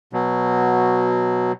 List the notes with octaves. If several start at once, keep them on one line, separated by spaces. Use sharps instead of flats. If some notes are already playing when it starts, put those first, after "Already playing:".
B2 F#3